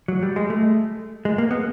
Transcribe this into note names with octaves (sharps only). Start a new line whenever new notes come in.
F#3
G3
G#3
A3
G#3
A#3
B3